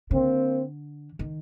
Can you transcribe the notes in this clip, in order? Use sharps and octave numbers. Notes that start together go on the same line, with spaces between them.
D3 A#3 C4
D#3